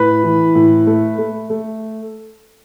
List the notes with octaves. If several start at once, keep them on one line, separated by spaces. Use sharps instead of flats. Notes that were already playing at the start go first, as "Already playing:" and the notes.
Already playing: A2 B4 B5
E3
A2
A3
A3
A3